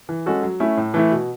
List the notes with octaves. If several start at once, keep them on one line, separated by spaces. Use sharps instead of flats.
E3
G#3 C#4 F#4 A4
F#3
A3 C#4 E4
A2
E3 A3 E4
B2